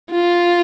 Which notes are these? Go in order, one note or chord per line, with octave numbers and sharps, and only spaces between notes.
F4